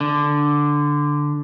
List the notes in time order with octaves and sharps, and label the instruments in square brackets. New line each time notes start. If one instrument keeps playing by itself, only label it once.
[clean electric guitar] D3